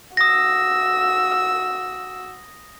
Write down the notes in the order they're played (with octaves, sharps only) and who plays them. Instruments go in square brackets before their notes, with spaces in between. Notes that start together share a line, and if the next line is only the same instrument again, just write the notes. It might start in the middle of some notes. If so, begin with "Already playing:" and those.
[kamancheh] F#4 E6 [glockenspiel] D#6 A#6